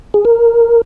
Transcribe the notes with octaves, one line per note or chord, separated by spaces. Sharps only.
G#4
A#4